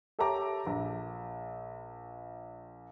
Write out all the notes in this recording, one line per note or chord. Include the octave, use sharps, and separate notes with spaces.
G4 A4 C#5 E5 A#5 D6
A#1